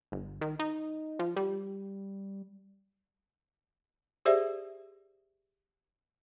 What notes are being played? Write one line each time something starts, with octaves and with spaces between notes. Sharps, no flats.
G1
D#3
D#4
F3
G3
G4 G#4 C5 D5 E5